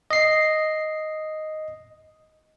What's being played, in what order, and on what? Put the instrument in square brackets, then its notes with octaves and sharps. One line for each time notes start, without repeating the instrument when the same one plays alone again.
[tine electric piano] D#5 C7